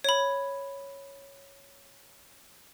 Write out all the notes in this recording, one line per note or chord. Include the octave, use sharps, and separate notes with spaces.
C#5 B5